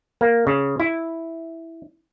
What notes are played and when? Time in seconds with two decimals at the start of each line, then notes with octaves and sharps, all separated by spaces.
0.21 A#3
0.47 C#3
0.80 E4